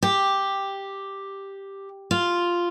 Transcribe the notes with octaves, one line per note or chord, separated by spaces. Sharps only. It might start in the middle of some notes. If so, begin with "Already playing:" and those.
G4
F4